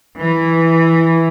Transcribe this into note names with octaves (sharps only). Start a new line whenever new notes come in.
E3